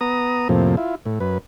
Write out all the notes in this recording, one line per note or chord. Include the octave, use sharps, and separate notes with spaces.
B3 A#5 D#6
F2 A2 C3 F3 A#3
E4 F4
A2
F#2 B4